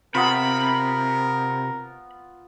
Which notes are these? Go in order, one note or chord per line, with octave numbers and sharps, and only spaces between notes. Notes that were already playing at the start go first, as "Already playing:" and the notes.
C3 B3 F4 A#4 B5